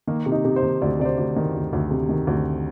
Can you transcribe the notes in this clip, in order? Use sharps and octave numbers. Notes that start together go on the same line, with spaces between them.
D#3 A#3
C3
D#4
C3
C5
D#3
D2 D5
C3 D5
C5
D2
D#3
D2
D2
C3
D#3
D2